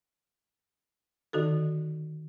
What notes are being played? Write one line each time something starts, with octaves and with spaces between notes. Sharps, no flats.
D3 D#3 D#4 F#4 A4